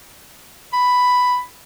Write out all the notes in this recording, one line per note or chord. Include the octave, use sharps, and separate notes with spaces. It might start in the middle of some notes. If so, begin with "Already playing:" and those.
B5